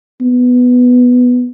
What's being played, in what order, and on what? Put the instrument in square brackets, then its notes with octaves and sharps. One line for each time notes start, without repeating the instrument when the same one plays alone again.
[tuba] B3